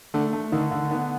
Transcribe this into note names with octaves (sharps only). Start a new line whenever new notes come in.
D3 A3
A3
D3 D#3
D3
D#3 B3